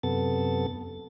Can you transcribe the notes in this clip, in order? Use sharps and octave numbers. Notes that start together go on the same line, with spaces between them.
F#2 C3 B3 A4 A6